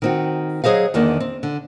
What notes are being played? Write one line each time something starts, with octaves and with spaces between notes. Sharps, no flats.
D#3 C4 F#4
F#3 G#4 C5 D#5 F5
E2 D3 D#3 A#3
C4
D3